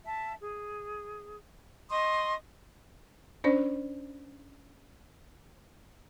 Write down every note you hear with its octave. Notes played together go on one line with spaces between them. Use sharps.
E5 A5
G#4
D#5 C6 C#6 D#6
C#4 D4 C5 D5